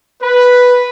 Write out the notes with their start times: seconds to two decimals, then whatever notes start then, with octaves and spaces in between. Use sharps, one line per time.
0.22 B4